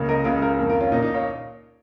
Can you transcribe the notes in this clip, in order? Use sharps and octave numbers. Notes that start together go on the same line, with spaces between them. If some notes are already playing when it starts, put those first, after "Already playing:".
Already playing: C#2 C#3 A#3
A#4 D#5
C#2 C#3 G#3 F4 A#4
F4 A#4
F2 D#3 A#3
F4 A#4
C#4 F4
A#2 A#3 D#4
D#4
C#5 F5